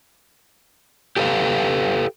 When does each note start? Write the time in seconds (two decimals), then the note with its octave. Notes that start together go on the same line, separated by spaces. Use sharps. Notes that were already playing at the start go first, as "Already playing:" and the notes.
1.17 G4 A4 B4 E5 F5